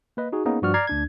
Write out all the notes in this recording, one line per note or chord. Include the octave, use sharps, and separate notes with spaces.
A#3 B4 D#5
D#4 F#4 G#4
A#3 B3 C#4 D#4 G#4
G2 F3 F#4 D5 C#6 F6
D5 A#5 F6 G#6 C7
D2 D4 G#6